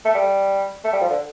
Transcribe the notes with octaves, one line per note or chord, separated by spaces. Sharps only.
A3
G3
A3
G3
F3
D3